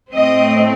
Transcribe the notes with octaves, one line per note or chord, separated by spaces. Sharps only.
A2 A3 C4 D#5